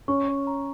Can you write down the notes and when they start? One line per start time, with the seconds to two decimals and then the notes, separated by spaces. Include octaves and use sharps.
0.08 C#4 C#6
0.28 C#5
0.47 A#5